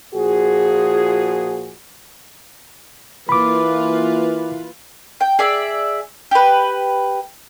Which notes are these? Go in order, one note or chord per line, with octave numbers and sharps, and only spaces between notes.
A#2 F3 F#4 G#4
E3 A#3 F4 B4 B5 D6
G5
G#4 D5 E5
G4 B4